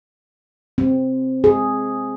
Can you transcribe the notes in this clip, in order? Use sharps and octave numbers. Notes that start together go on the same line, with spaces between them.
C4
G#4